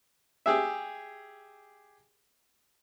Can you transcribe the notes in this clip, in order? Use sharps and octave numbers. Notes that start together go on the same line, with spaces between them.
G4 G#4 E5